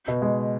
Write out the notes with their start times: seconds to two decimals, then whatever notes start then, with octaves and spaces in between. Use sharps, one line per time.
0.08 B2
0.22 G#3